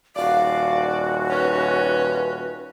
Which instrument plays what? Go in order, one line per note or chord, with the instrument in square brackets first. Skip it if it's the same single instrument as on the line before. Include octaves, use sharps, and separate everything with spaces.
[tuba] D#1 [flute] F#4 [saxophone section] D5 [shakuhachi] F5
[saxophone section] C#4 [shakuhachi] B4